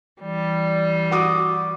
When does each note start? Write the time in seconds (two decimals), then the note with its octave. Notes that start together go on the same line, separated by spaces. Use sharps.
0.21 E3 G3
1.11 F#4 D6 D#6